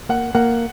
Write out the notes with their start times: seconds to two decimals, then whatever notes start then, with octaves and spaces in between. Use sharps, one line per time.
0.09 A#3 F#5
0.35 A#3 F#5